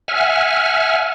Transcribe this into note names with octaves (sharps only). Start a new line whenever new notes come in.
E5 F#5 G#5 F6